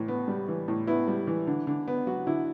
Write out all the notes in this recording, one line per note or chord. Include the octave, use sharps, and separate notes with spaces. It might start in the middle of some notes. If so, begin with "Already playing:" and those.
Already playing: A2 E3
B3
G3
E3
A2
B3 E4
G3
E3
D3
D3
B3
F#3 F#4
D3 E4